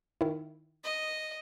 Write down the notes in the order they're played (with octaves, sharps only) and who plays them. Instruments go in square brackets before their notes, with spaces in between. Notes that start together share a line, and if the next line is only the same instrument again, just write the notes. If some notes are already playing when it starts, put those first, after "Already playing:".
[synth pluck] D#3 E4
[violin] D#5